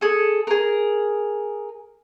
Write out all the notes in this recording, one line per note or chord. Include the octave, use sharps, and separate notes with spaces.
G#4 A4
G#4 A#4